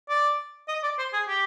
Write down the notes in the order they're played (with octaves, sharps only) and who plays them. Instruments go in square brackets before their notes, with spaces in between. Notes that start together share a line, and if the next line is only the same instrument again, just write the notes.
[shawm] D5
D#5
D5
C5
G#4
G4